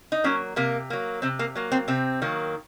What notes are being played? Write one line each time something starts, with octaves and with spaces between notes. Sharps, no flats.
D#4
F#3 A#3 C#4
C3 A#3
F#3 A#3
C3 C4
A#3
F#3 A#3
C4
C3 C4
D#3 F#3 A#3